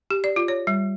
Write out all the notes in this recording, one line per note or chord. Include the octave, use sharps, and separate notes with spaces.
G4
D5
F4
C#5
G3